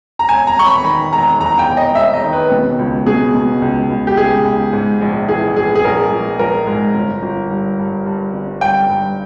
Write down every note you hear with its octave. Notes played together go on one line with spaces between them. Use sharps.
A#5
E1 G#5
A#5
E1 C#6
B5
D#3 B5
E1 A#5
E2 A#5
G5
E1
D#5
E1 E5
D#5
D#3
B4
B2
C#2
B2 G#4
B2
C#2
C#2
G4
C#2 G#4
C#2
G#2
A#1
E3 G#4
A#1 G#4
G#4
A#1 A#4
A#1
A#1 A#4
G#2
G1
G1
G2
G2
G2
G1
G2 G5
G2